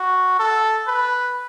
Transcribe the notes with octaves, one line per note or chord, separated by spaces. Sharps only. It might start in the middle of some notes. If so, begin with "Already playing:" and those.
Already playing: F#4
A4
B4